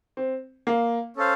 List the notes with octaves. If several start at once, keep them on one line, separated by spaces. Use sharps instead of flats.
C4
A#3
C#4 A4 C5 F5